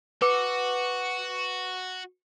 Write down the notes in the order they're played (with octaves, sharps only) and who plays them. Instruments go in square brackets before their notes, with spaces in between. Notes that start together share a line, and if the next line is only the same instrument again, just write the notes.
[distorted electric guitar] F#4 [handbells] B4 D6